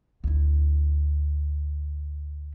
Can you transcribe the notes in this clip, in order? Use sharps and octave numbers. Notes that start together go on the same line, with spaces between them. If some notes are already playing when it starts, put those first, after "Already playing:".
D2 E4